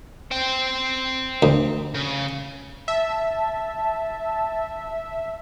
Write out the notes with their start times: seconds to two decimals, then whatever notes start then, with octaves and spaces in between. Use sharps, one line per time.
0.31 C5 G5
1.43 D2
1.94 C#3
2.88 E5 A5